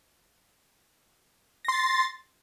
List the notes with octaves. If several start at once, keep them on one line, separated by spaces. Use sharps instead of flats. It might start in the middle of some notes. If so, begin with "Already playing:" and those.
C6 A6 A#6